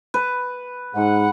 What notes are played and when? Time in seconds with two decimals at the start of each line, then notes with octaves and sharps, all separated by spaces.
0.14 B4
0.95 G#2 F#5